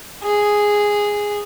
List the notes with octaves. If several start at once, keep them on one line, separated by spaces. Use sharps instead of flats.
G#4